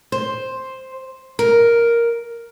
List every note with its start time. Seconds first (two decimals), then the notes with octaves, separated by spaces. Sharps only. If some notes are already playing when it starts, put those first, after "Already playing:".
0.12 C5
1.39 A#4